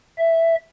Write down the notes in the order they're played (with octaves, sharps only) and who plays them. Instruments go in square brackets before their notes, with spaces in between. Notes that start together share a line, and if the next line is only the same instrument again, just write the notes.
[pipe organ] E5